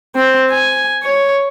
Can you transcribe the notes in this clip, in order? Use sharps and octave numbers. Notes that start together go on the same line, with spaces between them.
C4
G#5
C#5